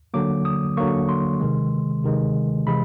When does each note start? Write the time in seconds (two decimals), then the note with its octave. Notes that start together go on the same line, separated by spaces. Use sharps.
0.14 D3 F#3 A#3 D6
0.45 D#6
0.77 D3 F#3 A#3 C#6
1.09 C6
1.41 C3 D#3 G#3
2.04 C3 D#3 G#3
2.67 C3 E3 G#3 B5